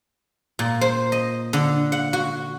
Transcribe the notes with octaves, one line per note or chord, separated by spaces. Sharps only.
A#2
C5
D#5
D3
F#5
F#4